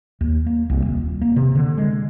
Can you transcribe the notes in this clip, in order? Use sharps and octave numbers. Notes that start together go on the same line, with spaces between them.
D#2
A#3
C2
D#1
A#3
C3
D3
G#3